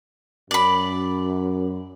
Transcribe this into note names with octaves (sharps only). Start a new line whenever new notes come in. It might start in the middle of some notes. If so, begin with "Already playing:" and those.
F#2 D5 B5